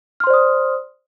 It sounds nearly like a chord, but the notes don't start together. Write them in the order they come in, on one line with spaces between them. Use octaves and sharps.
F6 C6 C5 D5 D#6